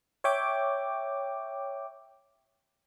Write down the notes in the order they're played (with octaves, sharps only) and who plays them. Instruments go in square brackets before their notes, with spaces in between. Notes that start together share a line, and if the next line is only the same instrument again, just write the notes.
[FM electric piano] C#5 E5 G5 D6